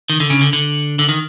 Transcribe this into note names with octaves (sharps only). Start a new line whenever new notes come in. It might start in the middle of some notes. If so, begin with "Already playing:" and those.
D#3
D3
C#3
D3
D3
D3
D#3